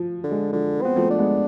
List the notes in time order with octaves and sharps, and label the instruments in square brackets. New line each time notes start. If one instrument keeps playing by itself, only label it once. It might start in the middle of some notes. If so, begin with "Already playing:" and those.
Already playing: [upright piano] F3
[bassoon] D3
[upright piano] G#3
[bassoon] D3 [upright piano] F3
[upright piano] B3 [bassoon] C4
[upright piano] F3 A3
[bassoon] D4
[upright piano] G#3 B3